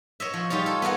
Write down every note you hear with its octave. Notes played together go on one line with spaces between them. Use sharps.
C#5 D#5 E5
F3
G3 D#4 F4 C#5
A4
B3 G#4 A#4 F#5